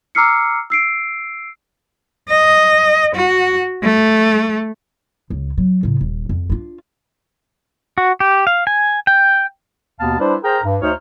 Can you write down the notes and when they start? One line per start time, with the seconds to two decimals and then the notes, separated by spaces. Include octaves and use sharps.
0.15 A#5 D6 E6 F6 C7 C#7
0.70 E6 C7 D7
2.30 D#5
3.15 F#4
3.83 A3
5.30 C#2
5.58 F#3
5.83 A2 C#3
6.01 D#1
6.29 F2
6.50 D4 F4
7.98 F#4
8.20 G4
8.47 F5
8.67 G#5
9.07 G5
9.99 D#2 B2 B3 F5 A5
10.19 G3 D4 E4 B4 C5
10.43 G#4 A#4 C5 G5 A#5
10.64 G2
10.82 D2 D#4 C5 C#5 F6